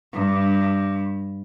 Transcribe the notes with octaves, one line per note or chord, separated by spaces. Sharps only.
G2